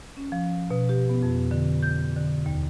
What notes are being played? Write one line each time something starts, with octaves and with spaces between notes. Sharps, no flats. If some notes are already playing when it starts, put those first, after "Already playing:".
C#4
F3
B2
G4
B3
F2
D3
G6
D3
D#2